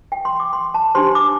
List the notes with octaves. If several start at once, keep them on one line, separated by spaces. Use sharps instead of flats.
G5
C6
D6
C6
A5
D4 G4 C5 C6
D6